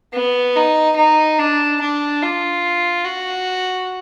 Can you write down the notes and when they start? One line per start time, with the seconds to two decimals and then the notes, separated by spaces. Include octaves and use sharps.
0.13 B3
0.56 D#4
0.96 D#4
1.39 D4
1.81 D4
2.22 F4
3.05 F#4